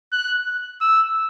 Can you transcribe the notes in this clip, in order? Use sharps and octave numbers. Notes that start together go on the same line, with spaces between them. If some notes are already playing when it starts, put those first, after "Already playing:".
F#6
E6